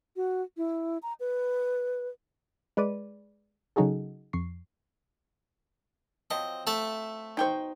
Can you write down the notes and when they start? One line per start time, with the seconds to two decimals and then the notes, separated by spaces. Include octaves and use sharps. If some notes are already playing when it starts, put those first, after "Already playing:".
0.16 F#4
0.57 E4
1.02 A#5
1.20 B4
2.77 G#3 B4 D5 D#7
3.76 C#3 F#3 D#4 F#4 G#4 A4
4.33 F2 C#6 C7
6.31 F3 F#3 C4 D#5
6.67 A3 E5 A5
7.37 B2 D#4 C5 G5 C#6